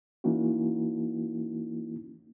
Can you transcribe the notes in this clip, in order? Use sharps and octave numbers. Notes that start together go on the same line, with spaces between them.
E3 A#3 C#4 D#4 E4 F#4